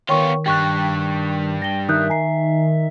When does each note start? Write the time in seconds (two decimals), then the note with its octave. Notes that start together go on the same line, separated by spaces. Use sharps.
0.09 D#3 B3 F4 C#5 G5 C#6
0.46 G2 G3 G5 C#6 F#6
1.62 G5 A#6 G7
1.89 D#3 E5 D#6 F#6 G6
2.10 G#5 A#5 C7